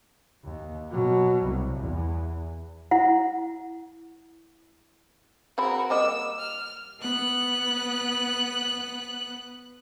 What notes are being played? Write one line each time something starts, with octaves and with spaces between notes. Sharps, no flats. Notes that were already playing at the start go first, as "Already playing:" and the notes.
D#2
B2 F#3
C2
E2
E4 F#5
C4 F#4 G#4 A#4 B5
G3 A#3 D#5 E6
F6
B3 F#6